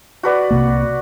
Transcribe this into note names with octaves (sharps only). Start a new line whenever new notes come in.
F#4 B4 D5
C2 C3 A#3